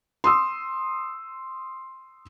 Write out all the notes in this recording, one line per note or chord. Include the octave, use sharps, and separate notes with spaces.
C6 D#6 E6